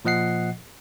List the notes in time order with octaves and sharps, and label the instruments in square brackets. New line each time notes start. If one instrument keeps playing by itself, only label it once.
[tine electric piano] A#2 F3 D#5 F#5 C7